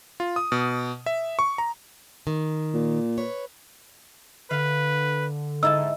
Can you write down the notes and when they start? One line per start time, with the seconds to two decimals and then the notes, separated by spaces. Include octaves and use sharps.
0.20 F4
0.36 D#6
0.52 B2
1.06 E5
1.39 C#6
1.58 A#5
2.27 D#3
2.74 A#2
3.17 B4 C#5
4.51 D3 B4 F5
5.63 G#2 D#4 E4 D#5 A5 E6